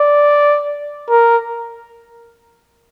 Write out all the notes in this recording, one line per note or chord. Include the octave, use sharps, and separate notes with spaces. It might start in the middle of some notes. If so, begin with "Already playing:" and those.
Already playing: D5
A#4